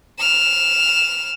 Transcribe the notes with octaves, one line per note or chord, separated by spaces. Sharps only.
F6 E7